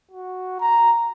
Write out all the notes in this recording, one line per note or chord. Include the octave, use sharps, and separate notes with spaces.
F#4
A#5